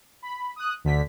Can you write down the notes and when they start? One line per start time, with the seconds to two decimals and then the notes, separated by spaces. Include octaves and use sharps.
0.22 B5
0.56 D#6 F#6
0.84 D2 D3 B6